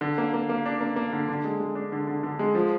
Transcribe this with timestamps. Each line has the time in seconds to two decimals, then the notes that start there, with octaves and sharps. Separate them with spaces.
0.01 D3
0.18 A#3
0.34 A#3
0.49 A#3
0.66 D4
0.81 A#3
0.96 A#3
1.13 D3
1.28 D3
1.44 G#3
1.60 G#3
1.75 D4
1.92 D3
2.07 D3
2.23 D3
2.39 G#3
2.55 F3